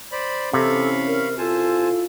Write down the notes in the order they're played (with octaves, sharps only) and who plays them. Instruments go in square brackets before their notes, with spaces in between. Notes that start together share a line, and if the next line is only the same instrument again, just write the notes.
[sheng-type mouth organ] C5 D5 B5
[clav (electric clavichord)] C3 [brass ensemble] E3 C#4 [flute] A4 [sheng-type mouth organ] F5 B5 C#6
[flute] A#4
[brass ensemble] E4 F4 [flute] A4 [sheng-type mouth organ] C5 G#5 A5